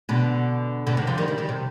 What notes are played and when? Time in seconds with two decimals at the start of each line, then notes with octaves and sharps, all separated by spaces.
0.09 B2 D3
0.87 B2 D3
0.97 C3 D#3
1.07 D3 F3
1.17 D#3 G3
1.28 D#3 G3
1.38 D#3 G3
1.49 C3